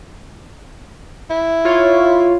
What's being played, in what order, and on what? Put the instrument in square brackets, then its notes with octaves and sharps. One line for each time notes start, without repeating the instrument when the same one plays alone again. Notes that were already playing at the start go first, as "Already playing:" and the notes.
[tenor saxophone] E4
[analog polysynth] F4 C#5